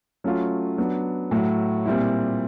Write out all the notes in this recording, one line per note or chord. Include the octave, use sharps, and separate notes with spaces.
F#3 A3 C#4 F4
F#3 B3 D4
A2 F#3 A3
A#2 G3 C4 E4